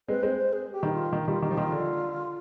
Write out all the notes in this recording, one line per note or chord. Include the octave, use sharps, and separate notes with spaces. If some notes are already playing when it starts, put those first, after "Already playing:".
G#3 C4 B4
G#3 C4 C5
C5
G#4
G4
D#3 G3 D#4
F4
D#3
D#3 G3 F4
D#3 G4
F3
D#3 F4
D3